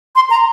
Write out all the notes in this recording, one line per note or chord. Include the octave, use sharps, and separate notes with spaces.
C6
A#5